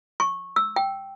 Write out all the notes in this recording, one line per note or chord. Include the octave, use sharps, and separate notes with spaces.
C#6
E6
G5